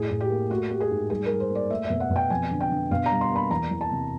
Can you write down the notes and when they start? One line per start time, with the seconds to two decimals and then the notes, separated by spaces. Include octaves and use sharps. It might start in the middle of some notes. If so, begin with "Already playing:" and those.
Already playing: A2 G#4
0.10 A2
0.21 G4
0.30 A#3
0.50 A3 F#4
0.70 A3 G4
0.80 G#4
0.91 G#2
1.10 G3 G#4
1.26 G3 A#4
1.40 C5
1.50 A#3
1.55 D5
1.70 A3 E5
1.85 E5
1.90 B2
2.00 F#5
2.10 B2
2.16 G5
2.30 F2 G#5
2.51 D3
2.60 G5
2.71 D3
2.91 B2 F5
3.06 G3 A#5
3.21 C6
3.31 A#3 B5
3.50 E2 A#5
3.71 E2
3.81 A5
3.91 C3